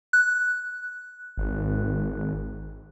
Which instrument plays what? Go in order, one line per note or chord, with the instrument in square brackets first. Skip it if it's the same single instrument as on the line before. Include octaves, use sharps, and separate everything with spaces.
[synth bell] F#6
[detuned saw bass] G#1